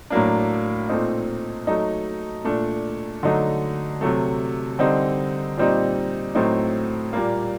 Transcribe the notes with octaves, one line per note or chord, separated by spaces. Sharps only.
A2 F#3 A#3 D4
A#2 A3 C4 D#4
F#3 A3 D#4
A#2 A3 D4
D3 F#3 A3 D#4
C3 F#3 A3
D3 G3 C4 D#4
A#2 G3 C4 D#4
A2 F#3 A3 C4 D#4
A#2 G3 A#3